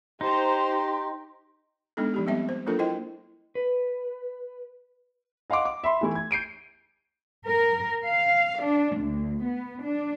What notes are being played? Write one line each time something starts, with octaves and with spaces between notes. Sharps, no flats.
D#4 G4 C5 A#5 C6
G#3 B3 D4 D#4 A4
F3 D#4 G4
G3 B3 C4 E5
C5
F#3 A#3 D4 F4 A4 A#4
E4 C5 D#5 G5
B4
D#5 F5 F#5 C6 D6
D6
E5 B5 C6
E3 A3 E4
G#6
G6 C7 D7 D#7
A#4
F5
D4
D2
B3
D4